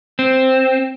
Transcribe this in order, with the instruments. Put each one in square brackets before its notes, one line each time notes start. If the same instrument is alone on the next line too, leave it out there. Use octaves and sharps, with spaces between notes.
[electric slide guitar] C4